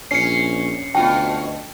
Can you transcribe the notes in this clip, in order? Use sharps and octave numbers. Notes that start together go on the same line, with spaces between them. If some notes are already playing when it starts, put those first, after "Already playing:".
A#1 C#4 C7 C#7
D2 B2 F4 F#4 G5